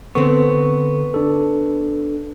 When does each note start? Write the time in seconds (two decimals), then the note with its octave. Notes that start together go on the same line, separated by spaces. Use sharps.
0.15 D3 B3 C4 A4 C#6
1.14 D4 A4